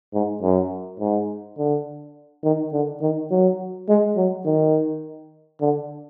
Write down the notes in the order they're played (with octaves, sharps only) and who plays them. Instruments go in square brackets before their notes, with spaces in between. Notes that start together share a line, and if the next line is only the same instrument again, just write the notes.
[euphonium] G#2
F#2
G#2
D3
D#3
D3
D#3
F#3
G#3
F#3
D#3
D3